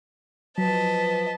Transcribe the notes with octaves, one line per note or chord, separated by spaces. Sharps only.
F3 F#3 B4 D#5 A5 B6